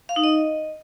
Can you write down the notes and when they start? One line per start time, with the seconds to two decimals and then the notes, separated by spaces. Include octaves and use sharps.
0.09 F5
0.16 D#4
0.24 D#5